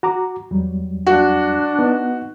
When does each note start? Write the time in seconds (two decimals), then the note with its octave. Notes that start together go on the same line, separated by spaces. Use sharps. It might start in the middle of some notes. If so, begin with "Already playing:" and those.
0.03 F#4 A#5 D6
0.51 E2 F#3 G3
1.07 D4 F#4
1.79 B3 D#4